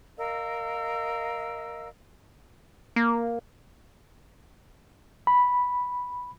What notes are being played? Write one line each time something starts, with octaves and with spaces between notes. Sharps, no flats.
A#4 D#5 F5 E6
A#3
B5